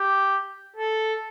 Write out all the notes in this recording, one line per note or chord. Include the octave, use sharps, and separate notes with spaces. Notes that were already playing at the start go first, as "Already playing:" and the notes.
Already playing: G4
A4